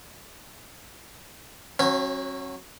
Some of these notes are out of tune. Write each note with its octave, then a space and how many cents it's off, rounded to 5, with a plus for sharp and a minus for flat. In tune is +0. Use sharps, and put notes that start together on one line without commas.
F#3 -5 C#4 -40 B5 +0